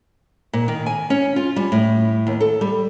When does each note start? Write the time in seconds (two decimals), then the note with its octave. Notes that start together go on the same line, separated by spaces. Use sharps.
0.53 A#2
0.68 D#3
0.86 G#5
1.10 C#4
1.36 F4
1.56 G3
1.72 A2
2.27 D#2
2.40 A4
2.61 G3